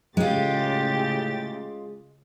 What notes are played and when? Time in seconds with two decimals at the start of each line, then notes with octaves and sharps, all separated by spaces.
0.17 A2 C#3 G#3 F4 G4 A6